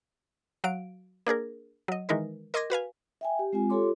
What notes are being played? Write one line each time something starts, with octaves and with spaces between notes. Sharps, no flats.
F#3 F#4 F5 D7
A#3 D4 G#4 A#4
F#3 D#5
D#3 E3 G#3 D#4 A#4 B4
A#4 D#5 C6 D6 G#6 A#6
F#4 B4 F5 G#5
E5 G5 G#5
G4
G#3 C4 F4 G#5
F4 G4 A4 C#5 C6 D6